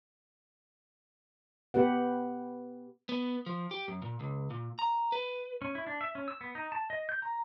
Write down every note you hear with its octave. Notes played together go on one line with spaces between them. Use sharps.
B3 G4 B4 F#5
B3
F3
G4
F#2
A#2
C#2
A#2
A#5
B4
C#4
E4
D4
E5
C#4
E6
B3
D#4
A5
D#5
G6
A#5